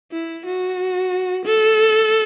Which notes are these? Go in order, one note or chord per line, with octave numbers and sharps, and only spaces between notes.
E4
F#4
A4